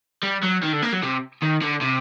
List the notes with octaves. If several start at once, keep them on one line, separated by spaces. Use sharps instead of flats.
G3
F#3
D#3
D3
A#3
F#3
C3
D#3
D3
C3